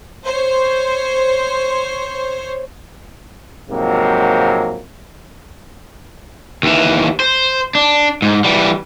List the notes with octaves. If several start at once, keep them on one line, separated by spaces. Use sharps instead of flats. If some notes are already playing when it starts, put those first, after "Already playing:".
C5 C#5
F2 G#2 C3 F#3 A#3
D#2 E3
C5
D4
G#2
E3 G3